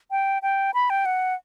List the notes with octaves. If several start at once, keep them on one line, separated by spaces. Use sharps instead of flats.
G5
G5
B5
G5
F#5